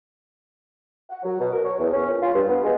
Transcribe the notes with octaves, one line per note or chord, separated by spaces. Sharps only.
F#5
F#3
B2
A#4
C#5
E2
C#4
A#2
F4
G2
B3
G#3